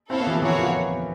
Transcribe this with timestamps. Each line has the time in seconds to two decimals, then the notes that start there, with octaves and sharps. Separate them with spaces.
0.10 C4 E4 A4 C#5 F5
0.20 B3
0.27 E3
0.31 F3
0.42 E3 F#4 A#4 C#5 F5
0.58 F3